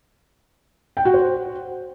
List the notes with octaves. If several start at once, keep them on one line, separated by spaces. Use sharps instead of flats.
G5
F#4
C5